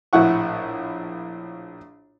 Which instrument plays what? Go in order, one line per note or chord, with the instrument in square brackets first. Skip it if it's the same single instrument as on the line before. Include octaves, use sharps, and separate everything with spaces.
[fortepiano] A#1 A2 E4 F#5 C#6